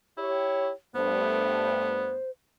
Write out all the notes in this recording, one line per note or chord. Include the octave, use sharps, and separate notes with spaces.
E4 G4 C#5
G2 A3 B3 C5